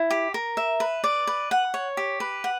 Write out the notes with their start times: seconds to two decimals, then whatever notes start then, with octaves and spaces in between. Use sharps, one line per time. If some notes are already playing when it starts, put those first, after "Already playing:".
Already playing: E4
0.11 G4
0.34 A#4
0.57 E5
0.80 B4
1.04 D5
1.27 B4
1.51 F#5
1.74 C#5
1.97 G4
2.20 B4
2.44 F#5